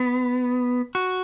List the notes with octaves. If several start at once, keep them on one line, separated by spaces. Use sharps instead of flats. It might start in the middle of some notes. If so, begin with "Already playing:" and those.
Already playing: B3
F#4